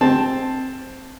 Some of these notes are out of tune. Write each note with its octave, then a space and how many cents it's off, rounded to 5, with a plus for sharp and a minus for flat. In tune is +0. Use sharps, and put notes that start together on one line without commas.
C4 +0 A5 +0